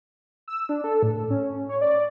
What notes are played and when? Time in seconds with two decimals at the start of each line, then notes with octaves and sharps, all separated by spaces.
0.48 E6
0.69 D4
0.84 A4
1.03 A2
1.30 C#4
1.69 C#5
1.81 D5